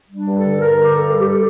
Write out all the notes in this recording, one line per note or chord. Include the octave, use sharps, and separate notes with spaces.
G3
D4
G2
A4
D3
D3 A#4
G2
G4
G2 A4
G3
G4
A4